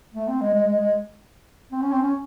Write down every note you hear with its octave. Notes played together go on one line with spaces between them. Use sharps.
A3
C4
G#3
G#3
G#3
G#3
C4
C#4
C4
C#4